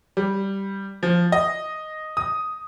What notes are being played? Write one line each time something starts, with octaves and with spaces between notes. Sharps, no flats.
G3
F3
D#5
D#6